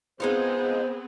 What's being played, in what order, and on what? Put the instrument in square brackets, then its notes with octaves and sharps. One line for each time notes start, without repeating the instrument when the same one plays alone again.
[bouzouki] G#3 D#4 F4 [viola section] B3 C4 G#4 [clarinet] C5